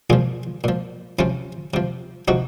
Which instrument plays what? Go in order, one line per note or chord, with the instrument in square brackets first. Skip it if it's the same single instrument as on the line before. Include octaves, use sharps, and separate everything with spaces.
[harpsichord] A#2 F3 F4 G#4
A#2 F3
C3 F3 C#4 F4
C3 F3
C3 F3 D#4 F#4